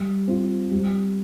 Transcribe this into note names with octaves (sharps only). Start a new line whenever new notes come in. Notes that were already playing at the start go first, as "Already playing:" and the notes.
Already playing: G3
C4 F4
G3